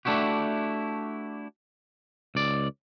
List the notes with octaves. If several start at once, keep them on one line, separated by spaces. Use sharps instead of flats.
A3 D4 E4 F#4 G4
C#2 D5